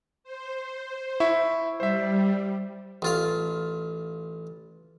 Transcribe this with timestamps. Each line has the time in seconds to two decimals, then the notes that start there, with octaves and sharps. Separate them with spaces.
0.24 C5
1.20 E4 E5 C#6
1.80 G3 C5 E5
3.02 A1 F4 F5